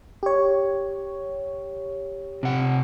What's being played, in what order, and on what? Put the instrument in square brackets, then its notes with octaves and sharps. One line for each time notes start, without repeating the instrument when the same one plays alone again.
[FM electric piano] G4 C#5
[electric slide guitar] C3 F#5